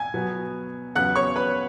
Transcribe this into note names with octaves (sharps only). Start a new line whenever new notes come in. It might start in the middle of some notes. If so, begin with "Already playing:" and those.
Already playing: G#5 G#6
B2 F#3 B3
E2 C#3 F#3 B3 F#5 F#6
C#5 C#6
B4 B5